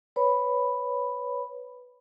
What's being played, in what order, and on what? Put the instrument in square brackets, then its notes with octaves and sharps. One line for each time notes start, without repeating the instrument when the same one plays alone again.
[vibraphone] B4 C#5 B5